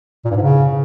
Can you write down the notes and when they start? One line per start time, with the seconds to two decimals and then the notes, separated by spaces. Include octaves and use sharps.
0.25 A#2
0.31 G2
0.36 G#2
0.42 C#3